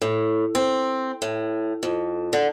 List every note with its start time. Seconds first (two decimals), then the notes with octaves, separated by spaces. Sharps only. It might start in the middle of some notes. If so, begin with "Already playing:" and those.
0.02 A2
0.55 C4
1.22 A2
1.83 F2
2.33 D3